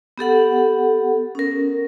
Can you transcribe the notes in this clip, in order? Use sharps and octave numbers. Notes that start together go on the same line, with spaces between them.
B3 G4 A4 F#5
C#4 A#4